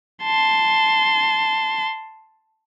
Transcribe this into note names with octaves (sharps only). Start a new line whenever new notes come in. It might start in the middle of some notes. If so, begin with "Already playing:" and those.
A5 C6